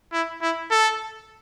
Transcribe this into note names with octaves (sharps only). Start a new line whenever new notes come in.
E4
E4
A4